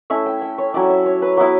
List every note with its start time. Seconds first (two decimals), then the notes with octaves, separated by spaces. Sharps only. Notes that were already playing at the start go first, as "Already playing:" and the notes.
0.10 A3 C#4 E4 E5
0.26 G5
0.42 G5
0.58 C#5
0.74 F#3 C#4 E4 D5
0.90 E5
1.06 C#5
1.22 B4
1.37 F#3 B3 E4 B4